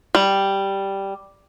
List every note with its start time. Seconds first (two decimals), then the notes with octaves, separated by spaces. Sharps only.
0.15 G3